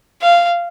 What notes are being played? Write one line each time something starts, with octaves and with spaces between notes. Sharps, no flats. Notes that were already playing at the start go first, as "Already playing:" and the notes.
F5